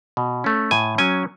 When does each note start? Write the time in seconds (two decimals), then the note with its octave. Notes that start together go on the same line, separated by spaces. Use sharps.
0.17 B2
0.44 A3 C#4
0.71 A2 G#5
0.98 F#3 C#4 G#5